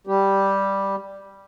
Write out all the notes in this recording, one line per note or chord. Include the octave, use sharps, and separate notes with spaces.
G3 G4